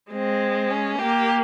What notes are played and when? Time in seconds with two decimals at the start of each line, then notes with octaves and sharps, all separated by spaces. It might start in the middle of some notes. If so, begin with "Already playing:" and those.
0.12 G#3 C4
0.70 C#4
0.98 A#3 G4